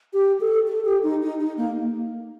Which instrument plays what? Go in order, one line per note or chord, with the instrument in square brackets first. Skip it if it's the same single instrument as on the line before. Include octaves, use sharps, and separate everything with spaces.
[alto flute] G4
A4
A4
G4
D#4
D#4
D#4
A#3